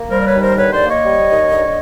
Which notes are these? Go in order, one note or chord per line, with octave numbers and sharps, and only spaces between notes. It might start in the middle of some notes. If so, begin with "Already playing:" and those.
Already playing: A#3
G3 A#4 C5
D5
B4 C#5
D#2
A#4 C5
D3 B4 C#5
C5 D5
A#3
C#5 D#5
G3
D#2
D3